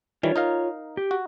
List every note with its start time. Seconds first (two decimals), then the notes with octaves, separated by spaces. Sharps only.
0.23 D#3 E3 G3 F4 C#5
0.36 D#4 A#4 F5
0.97 G4
1.11 F#4